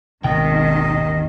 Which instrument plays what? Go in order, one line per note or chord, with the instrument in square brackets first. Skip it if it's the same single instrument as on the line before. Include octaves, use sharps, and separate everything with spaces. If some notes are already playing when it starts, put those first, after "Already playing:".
[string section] G#1 D#3 [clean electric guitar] D#2 G5 [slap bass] B2 B3 C#4 [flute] D#5